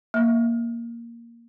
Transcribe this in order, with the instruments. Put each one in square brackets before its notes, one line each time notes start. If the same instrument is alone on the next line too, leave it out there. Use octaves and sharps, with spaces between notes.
[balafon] A#3